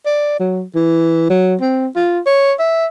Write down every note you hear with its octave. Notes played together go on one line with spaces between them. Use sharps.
D5
F#3
E3
F#3
C4
F4
C#5
E5